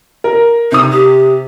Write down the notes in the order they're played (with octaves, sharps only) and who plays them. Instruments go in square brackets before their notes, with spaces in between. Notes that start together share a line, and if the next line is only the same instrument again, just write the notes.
[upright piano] A#4
[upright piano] C3 D#6 [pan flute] D#4
[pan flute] G4